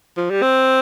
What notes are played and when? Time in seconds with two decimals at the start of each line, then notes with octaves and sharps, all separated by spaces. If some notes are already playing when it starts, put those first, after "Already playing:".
0.17 F3
0.30 G3
0.42 C4